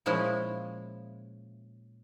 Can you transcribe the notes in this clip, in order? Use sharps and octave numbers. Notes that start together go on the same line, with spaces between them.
A#2 F3 G#3 C#4 E4